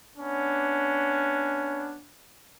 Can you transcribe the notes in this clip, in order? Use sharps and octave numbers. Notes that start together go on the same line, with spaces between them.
B3 C#4 D4